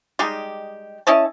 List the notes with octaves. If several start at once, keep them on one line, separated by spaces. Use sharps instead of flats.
G3 G#3 D#4 G4
C#4 E4 D#5 A5